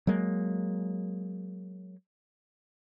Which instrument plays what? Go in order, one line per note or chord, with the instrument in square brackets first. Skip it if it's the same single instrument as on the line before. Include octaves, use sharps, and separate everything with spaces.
[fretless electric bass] F#3 G#3 A#3